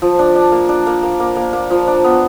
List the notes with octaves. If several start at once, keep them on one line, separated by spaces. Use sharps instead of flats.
F3
D4
D4
A#3
D4
A#3
A#3
A#3
A#3
A#3
F3
D4
B3